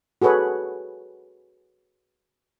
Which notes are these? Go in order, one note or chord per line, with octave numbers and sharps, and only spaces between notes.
F#4 G#4 A4 B4 C#5